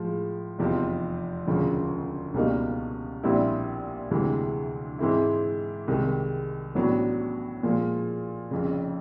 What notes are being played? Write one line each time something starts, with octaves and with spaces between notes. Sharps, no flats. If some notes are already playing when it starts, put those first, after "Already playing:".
Already playing: A2 F3 G#3
F1 E2 C3 F3
E1 D2 C#3 F3
C#2 B2 G3 A#3 D#4
A#1 A#2 G3 C4 E4
D2 C3 E3 G#3
G#2 E3 G#3 C4 E4
C2 C3 D#3 G#3
A1 A2 F#3 B3 D4
A#2 F3 G#3
F1 F2 C#3